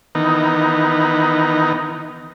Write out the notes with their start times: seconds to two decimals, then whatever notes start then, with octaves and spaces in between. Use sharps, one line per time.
0.15 D#3 E3 B3 D#4